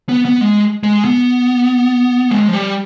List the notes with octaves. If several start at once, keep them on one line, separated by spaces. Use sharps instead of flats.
B3
B3
G#3
G#3
B3
G#3
F3
G3